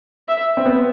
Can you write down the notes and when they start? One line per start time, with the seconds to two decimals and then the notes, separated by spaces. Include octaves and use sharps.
0.29 E5
0.57 C4
0.65 B3